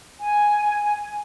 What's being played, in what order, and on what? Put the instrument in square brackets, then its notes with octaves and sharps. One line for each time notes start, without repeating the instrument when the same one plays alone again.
[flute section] G#5